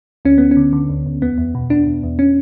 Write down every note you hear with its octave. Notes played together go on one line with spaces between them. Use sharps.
D2 C#4
D2 B3
C#4
D3
D3
D2
D2
E2 B3
E2
B2
B2 D4
E2
E2
C#4